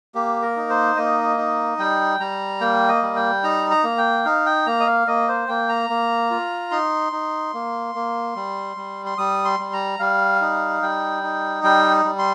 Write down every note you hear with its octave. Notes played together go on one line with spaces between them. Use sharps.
A#3 G4
A#4
D#4
C5
A#3 D#5
D#4
G3 G5
G3 A#5
A#3 G5
D#5
G3
G5
D#4 A#5
A#5
A#3
G5
D#4 F5
G5
A#3 A#5
D#5
F5
A#3 D#5
C5
A#3 G5
A#5
A#3
F4
D#4 C6
D#4
A#3
A#3
G3
G3
C6
G3 D#6
C6
G3
A#5
G3 F5
D#4
G3 G5
D#4
G3 G5
G3
C6